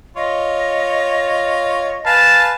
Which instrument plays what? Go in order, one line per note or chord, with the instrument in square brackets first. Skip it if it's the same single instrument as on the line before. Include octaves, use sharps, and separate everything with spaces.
[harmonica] F4 C#5 [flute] D#5
[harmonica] B4 F5 G#5 [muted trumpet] A5